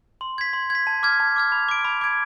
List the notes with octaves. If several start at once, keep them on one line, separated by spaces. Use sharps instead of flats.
C6
G#6 B6
C6
G#6 B6
A5
D6 F6 G#6
A5
D6 F6 G#6
B5
D6 G#6 D7
B5
D6 G#6 D7